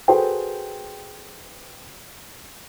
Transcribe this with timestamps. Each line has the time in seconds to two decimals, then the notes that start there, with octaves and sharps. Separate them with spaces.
0.08 F#4 G#4 A4 B4 C5 G5